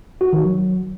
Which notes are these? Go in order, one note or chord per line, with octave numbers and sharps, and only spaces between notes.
F#4
D#3
F#3